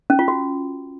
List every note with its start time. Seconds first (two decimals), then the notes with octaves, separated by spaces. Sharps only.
0.10 C#4
0.19 F4
0.28 F#4